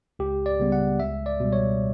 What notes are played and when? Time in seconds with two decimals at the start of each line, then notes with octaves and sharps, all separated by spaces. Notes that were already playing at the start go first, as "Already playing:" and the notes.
0.19 C#2 G4
0.46 D5
0.60 C#3 G3 B3
0.72 F#5
0.99 C#2 E5
1.26 D5
1.40 B2 G3
1.53 C#5